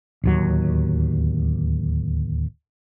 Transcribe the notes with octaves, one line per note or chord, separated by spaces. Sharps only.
D1 D#2 F#3